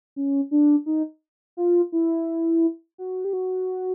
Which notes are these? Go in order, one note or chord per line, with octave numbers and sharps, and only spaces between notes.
C#4
D4
D#4
F4
E4
F#4
G4
F#4